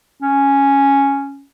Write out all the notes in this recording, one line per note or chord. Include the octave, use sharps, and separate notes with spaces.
C#4